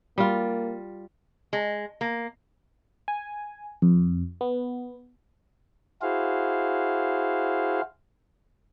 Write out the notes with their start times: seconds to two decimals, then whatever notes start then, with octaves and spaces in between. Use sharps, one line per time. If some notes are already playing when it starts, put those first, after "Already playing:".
0.18 G3 A#3 F4
1.53 G#3
2.01 A#3
3.08 G#5
3.82 F2
4.41 B3
6.02 E4 F#4 G#4 C5 F5